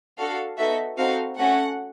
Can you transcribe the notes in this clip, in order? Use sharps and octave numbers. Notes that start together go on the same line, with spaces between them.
D4 F#4 A4 F5
B3 D#4 F#4 A4 E5
C4 D#4 F#4 A4 F5
A3 C#4 F#4 A4 F#5